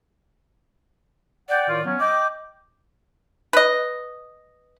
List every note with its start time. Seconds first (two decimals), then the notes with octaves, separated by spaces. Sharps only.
1.49 D5 F#5 G5
1.68 A2 D#3 F4
1.85 F#3 B3 C#4
2.00 D#5 G5 D6
3.53 B4 D#5